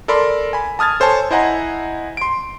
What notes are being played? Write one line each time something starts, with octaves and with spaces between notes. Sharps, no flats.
A4 A#4 D5 B5 C6
G#5 B5
A5 D#6 F6 G#6 A6
A4 C5 C#5 G#5 A5
E4 C5 D#5 F#5 G#5 A#5
C6 D7